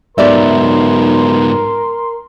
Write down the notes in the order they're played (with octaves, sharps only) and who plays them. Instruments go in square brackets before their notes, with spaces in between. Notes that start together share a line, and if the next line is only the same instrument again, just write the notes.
[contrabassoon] B1 [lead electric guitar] G#2 B3 [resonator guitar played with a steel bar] G4 D5 E5 [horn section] A#4 C6